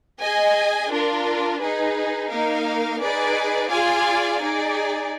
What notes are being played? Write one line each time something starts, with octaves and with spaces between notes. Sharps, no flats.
G#4 D#5 G#5
D4 F4 A#4
D#4 G#4 B4
A#3 D#4 A#4 F5
D#4 G#4 B4 D5
F4 G#4 D5 F5 G#5
D#4 G#4 D5